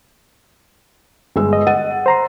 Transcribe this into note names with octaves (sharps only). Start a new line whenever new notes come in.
G1 G#3 E6
D#5
F#5 A6 D#7
C5 A#5 C6